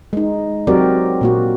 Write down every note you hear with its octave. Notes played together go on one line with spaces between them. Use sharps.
G#3 D#4
F#3 C4 F#4 G4 A#4 D5
A#2 A#3 F#4